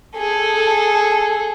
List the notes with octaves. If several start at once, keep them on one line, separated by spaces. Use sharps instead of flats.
G#4 A4